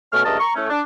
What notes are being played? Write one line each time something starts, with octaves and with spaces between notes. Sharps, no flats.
B2 A3 C#4 F6
C#2 G2 A3 A#4 D#5 A5
A#5 C#6
A2 A3 C#4
D4